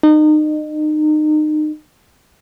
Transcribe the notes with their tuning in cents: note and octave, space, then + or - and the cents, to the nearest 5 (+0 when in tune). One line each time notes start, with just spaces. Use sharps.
D#4 -30